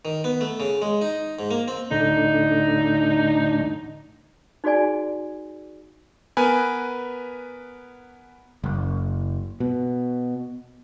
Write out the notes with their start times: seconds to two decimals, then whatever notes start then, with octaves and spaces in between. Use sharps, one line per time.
0.05 D#3
0.24 B3
0.41 A3
0.60 C#3
0.82 G#3
1.01 D#4
1.39 G#2
1.51 A#3
1.68 C4
1.91 D2 A2 D3 D#4
4.64 D#4 F#4 G#4 D5 G#5
6.37 B3 A#4 B4 G#5
8.64 F#1
9.60 B2